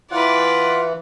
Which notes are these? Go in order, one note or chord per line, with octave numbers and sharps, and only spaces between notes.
E3 F4 B4 D5 F#5